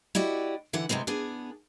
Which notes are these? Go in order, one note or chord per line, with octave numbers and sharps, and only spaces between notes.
E4 F#4 G4 D5 D#5
D3 E3 E4 F#5
C3 D#3 G#3 B3 C4
B3 D4 G#4 G#5